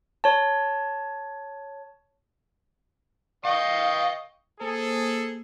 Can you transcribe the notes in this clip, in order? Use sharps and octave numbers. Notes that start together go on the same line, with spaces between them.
C#5 A5
D#5 F5 G5 C#6
A#3 G#4 A4 C5